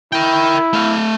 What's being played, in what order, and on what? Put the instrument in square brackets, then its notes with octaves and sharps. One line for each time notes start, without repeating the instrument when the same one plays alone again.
[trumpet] E4 [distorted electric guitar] A#4 G5
[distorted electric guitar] A3 F5